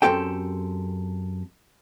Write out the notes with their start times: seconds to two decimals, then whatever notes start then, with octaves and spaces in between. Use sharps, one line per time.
0.02 F#2 F3 C4 G4 A4 G5